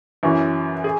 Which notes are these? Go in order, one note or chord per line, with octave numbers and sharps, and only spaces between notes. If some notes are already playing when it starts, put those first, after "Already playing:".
F#2 E3 C#4 F#4
G#4